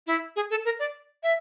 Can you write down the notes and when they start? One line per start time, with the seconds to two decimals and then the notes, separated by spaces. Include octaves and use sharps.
0.07 E4
0.36 G#4
0.51 A4
0.65 A#4
0.79 D5
1.23 E5